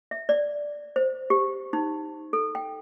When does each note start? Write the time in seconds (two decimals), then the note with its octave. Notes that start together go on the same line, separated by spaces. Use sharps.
0.11 E5
0.29 D5
0.96 C5
1.30 G4
1.73 D#4
2.33 A4
2.55 G5